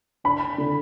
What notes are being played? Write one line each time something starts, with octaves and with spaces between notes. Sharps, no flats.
D4 B5
D3